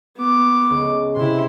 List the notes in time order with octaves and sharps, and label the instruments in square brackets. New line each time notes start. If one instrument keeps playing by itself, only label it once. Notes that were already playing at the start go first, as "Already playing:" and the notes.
[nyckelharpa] B3 D6
[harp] C#2
[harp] C3 [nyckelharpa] E4 C6